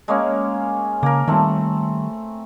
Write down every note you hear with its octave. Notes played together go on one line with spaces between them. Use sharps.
G#3 A#3 C#4
C#3 A#3 A#4
D#3 G3 A3 C4